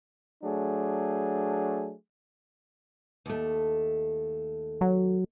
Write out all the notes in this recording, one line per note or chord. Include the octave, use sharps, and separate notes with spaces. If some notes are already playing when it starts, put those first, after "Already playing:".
F#3 A3 D4 G#4
D#2 A3
F#3